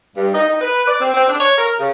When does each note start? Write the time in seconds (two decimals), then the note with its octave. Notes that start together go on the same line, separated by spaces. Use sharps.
0.15 G2
0.33 D#4
0.48 D#4
0.61 B4
0.87 D5
1.00 C4
1.13 C4
1.27 D4
1.39 C#5
1.57 A#4
1.79 C#3